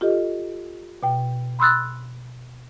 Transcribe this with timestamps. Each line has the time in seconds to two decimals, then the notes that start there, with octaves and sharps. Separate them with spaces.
0.01 F4 G4 A4 D#5
1.03 B2 G5
1.59 B5 C6 D#6 E6 F#6 A6